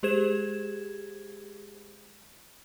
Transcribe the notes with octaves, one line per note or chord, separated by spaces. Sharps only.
G#3 G4 G#4 C5 G#6 E7